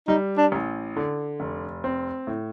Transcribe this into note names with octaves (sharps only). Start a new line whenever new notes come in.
G3 D#4
D4
A1
D3
F1
C4
A2